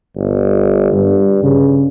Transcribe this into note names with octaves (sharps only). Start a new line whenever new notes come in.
G1
G2
C#3